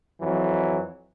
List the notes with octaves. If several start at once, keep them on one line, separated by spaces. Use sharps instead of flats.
F2 E3 F#3